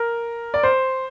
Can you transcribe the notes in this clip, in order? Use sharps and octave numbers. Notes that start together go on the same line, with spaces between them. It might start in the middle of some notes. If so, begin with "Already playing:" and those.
Already playing: A#4
D5
C5